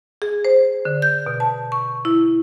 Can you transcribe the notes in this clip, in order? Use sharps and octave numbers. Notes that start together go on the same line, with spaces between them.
G#4
C5
D3
G6
B2
A5
C#6
E4